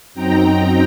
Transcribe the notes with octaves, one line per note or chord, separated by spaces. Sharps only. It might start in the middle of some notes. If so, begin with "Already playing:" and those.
F#2 F#3 C4 D#4 G5 A#5